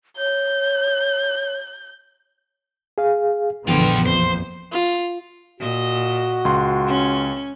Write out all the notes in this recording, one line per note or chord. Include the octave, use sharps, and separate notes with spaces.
C#5 G6
G#4 F5
A#1 F#2 D3 E3 F3 B3 F4 G5
A#1 F2 C5
F4
A#2 F#4 D#5
C#2 C6
C#4